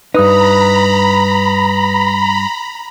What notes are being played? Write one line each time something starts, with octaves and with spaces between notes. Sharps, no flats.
G2 D#4 B4 A#5 B5 D#6